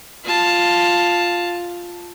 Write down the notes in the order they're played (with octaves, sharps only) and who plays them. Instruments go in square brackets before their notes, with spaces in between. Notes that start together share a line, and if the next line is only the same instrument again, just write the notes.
[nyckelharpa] F4 A5